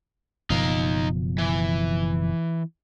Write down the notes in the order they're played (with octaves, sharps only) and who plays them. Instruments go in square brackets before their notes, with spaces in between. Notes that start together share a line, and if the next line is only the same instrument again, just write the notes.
[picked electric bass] F#1 B2 F3 [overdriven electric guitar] D#4 F5
[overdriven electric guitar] E3